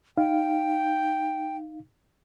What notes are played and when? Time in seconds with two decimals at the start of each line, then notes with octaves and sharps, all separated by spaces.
0.17 D#4 F5 G5